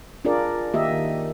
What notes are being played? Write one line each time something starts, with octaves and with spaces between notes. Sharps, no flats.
D4 F4 G#4 A#4 D5
D#3 A#3 G4 D#5 E5
D#3